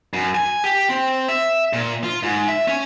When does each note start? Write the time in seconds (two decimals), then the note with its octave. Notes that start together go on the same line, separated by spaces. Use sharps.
0.14 F#2
0.35 G#5
0.64 G4
0.89 C4
1.28 E5
1.73 A#2
2.04 F4
2.23 G#2
2.48 E5
2.68 C#4